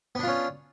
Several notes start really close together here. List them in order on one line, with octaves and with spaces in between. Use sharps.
B3 D4 F4 C#4